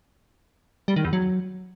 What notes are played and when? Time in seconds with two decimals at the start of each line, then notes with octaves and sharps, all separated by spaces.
0.88 G3
0.96 D#3
1.05 E2
1.13 F#3